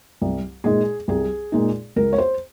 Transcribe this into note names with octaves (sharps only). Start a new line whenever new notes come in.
C2
A#2 G#3 D#4 G#4
C2 G#4
A#2 G#3 D#4
C#2 A#4
C#5
C5